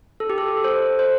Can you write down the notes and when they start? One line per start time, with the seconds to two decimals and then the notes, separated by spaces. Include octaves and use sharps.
0.20 A4
0.30 G4
0.38 A4
0.64 A4 C5
0.99 C5